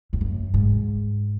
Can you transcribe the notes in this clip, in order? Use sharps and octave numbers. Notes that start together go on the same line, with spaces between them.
F2
F#2
G#2